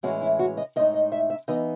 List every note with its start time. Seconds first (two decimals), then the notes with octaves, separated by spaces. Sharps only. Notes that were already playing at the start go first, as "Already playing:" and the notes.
0.03 A2 E3 G#3 C#4 F#4
0.21 E4
0.39 F#4
0.57 D#5
0.76 A2 G#3 D#4 D#5
0.94 D#5
1.12 E5
1.30 E5
1.48 E3 B3 D#4 D#5